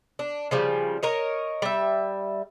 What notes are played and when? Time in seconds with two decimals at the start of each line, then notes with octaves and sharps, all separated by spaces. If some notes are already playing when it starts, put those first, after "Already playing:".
0.19 D4
0.51 C#3 F3 G3
1.03 A#4 C#5 D#5
1.62 G3 E5